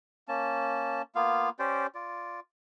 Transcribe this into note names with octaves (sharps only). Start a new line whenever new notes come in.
A#3 C#4 A5
A#3 B3 F4 F5
C#4 G4 C5 D5
F4 D5